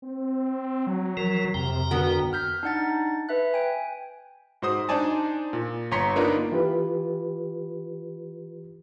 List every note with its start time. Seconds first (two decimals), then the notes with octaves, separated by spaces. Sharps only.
0.02 C4
0.87 F#3
1.17 E3 F3 A#4
1.54 F2 C3 G5 A#5
1.91 D3 B3 F#4 A#4
2.33 F6 G6 B6
2.63 D4 D#4 F#5 A6
3.29 B4 E5 F#6
3.54 G5 G#5
4.62 G#2 F#4 C5 D#6
4.89 D4 D#4 C5 D5 G#5 A5
5.53 A#2
5.91 G1 C#5 A#5 C6 B6 C#7
6.16 A#3 B3 D4 D#4 F4 A#4
6.52 E3 F4 G4 B4